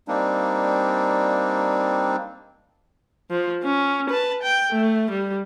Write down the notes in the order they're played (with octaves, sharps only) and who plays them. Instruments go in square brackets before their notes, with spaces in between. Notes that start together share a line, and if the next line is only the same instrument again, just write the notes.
[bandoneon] G3 A#3 C4 D4 D#4
[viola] F3
C#4
B4 A5
G5
A3
G3